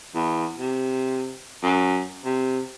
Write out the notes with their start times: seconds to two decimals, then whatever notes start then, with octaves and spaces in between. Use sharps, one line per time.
0.15 E2
0.59 C3
1.63 F#2
2.25 C3